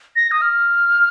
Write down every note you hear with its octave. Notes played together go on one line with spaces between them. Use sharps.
A#6
D#6
F6